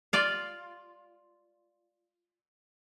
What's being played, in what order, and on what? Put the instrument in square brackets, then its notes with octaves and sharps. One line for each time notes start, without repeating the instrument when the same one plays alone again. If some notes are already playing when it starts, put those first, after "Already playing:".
[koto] F4 D5 F5